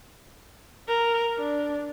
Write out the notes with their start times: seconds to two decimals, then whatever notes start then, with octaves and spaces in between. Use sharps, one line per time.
0.88 A#4
1.38 D4